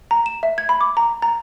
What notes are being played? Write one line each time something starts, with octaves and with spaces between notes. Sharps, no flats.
A#5
E7
E5
G#6
B5
D6
A#5
A#5